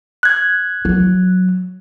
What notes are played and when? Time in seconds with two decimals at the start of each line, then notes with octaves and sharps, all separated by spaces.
0.23 F#6 G#6
0.85 F#3